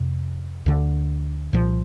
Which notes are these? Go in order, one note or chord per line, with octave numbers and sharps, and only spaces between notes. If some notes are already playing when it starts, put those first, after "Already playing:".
Already playing: F2 C3
D2 D3
C2 A#2 F3